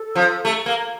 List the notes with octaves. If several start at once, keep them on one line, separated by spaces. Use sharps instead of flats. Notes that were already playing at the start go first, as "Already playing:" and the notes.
Already playing: A4
F3
A3
A#3